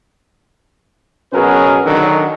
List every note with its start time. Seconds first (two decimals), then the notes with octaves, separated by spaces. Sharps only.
1.33 B2 F#3 C#4 G#4 A#4 B4
1.85 D3 D#3 F#3